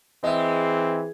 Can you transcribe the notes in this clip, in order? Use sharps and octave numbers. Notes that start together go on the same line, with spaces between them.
E3 G#3 C4 D#5 E5